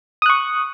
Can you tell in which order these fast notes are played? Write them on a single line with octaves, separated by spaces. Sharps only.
D#6 F#6 C#6